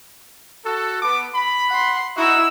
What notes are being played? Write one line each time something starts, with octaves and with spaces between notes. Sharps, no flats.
F#4 A4
B3 D6
B5
F#5 C6
D#4 E4 F#4 E6